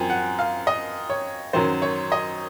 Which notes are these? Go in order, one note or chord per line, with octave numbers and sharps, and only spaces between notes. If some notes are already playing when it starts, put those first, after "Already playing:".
Already playing: F#2 F3 C4 G#5
F#5
F5
D#5
C#5
F#2 D#3 F#3 C#4 C5
C#5
D#5